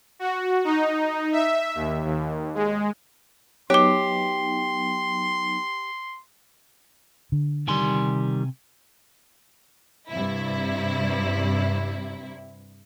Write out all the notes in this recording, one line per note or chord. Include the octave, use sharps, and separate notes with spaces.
F#4
D#4
E5
D#2
D#2
G#3
F#3 B3 D#4 G4 C#5 C6 D6
D3
C3 D#3 G3 G#5 C6
G2 C3 E4